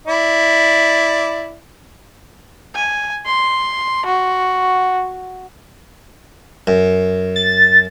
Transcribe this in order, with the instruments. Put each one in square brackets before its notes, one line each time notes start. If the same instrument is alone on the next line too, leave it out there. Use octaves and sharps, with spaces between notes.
[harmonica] E4 D5
[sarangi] G#5
C6
F#4
[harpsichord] F#2
[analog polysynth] A6